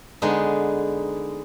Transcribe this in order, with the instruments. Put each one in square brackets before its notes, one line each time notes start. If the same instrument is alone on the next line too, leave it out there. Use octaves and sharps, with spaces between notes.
[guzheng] D3 G#3 B3 D#4